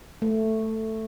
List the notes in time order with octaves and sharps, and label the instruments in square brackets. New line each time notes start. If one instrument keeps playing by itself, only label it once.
[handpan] A3